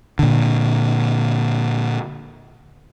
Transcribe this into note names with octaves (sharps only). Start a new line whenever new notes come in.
A#2 D3